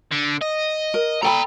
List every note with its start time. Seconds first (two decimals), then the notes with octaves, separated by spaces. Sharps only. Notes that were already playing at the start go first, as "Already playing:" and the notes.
0.11 D3
0.41 D#5
0.94 A#4
1.23 A4 D5 G5 A#5 B5